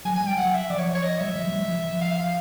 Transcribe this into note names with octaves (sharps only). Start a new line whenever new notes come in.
F#3 G#5
G3 G#5
G5
F#3 F#5
E5
F3 D5
C#5
C#5
D#5
G3 E5
F#3
F3
F#3
G3
F3
F3
F5
F5